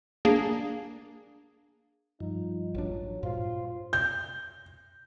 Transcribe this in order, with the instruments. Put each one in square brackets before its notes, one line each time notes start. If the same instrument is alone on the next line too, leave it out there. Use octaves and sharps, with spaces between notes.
[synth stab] A#3 D4 G#4
[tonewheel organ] G2 F3 [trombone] D#4
[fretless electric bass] A1 D4 [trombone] F#3
[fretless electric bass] G2 A#2 [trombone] F4 [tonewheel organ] C5
[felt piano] G6